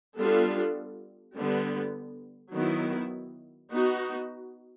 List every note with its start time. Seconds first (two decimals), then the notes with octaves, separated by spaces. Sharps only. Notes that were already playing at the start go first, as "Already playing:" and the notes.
0.16 G3 B3 D4 F4 A4
1.35 D3 G3 B3
2.53 D#3 F#3 B3 E4
3.71 B3 D#4 F#4